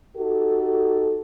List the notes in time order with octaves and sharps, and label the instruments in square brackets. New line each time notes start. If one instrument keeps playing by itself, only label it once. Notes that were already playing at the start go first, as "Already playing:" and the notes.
[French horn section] D#4 F#4 G4 A4